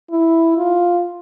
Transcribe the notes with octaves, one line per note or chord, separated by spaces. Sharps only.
E4
F4